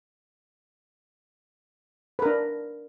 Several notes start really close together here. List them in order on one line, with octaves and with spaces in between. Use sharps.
B4 A#4 D4